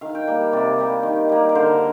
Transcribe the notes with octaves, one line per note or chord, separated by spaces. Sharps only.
D#3 F5
G5
G3 A#3
C3 D5
G3 A#3
D#3
G3 A#3
A#4
D3 C5